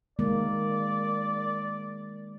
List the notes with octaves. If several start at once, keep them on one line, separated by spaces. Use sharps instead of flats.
D#3 G#3 A#3 D5